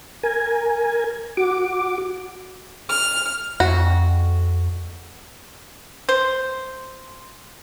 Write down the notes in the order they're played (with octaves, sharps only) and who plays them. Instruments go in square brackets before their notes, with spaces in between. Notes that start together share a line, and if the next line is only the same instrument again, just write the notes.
[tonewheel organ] A#4 G#5
F#4 D6
[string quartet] F6
[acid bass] F2 [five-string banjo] F#4
[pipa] C5